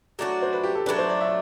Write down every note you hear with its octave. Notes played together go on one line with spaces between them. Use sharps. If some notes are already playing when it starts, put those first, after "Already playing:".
F#3 A3 D4 F#4
C5
B4
G4
A4
F#3 A3 D4 B4
C5
D5
E5